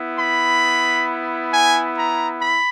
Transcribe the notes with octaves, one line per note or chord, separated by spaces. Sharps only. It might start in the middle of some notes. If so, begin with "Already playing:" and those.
Already playing: B3 E4
B5
G#5
A#5
B5